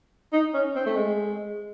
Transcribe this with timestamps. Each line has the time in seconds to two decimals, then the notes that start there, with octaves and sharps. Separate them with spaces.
0.33 D#4
0.54 C#4
0.75 C4
0.86 A3
0.96 G#3